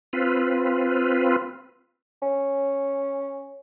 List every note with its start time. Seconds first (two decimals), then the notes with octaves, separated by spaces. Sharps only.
0.13 C4 F4 B4
2.22 C#4